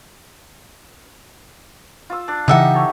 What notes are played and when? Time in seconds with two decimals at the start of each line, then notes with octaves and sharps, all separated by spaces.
2.10 F4 E6
2.28 D4 D5
2.48 C#3 E3 D#4 G4 D#5 E5 F#5
2.74 A4 C#5